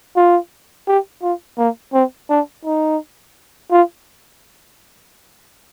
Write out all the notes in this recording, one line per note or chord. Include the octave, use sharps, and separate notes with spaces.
F4
G4
F4
A#3
C4
D4
D#4
F4